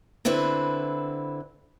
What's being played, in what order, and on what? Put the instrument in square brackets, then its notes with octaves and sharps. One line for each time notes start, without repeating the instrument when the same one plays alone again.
[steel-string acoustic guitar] D3 C4 E4 B4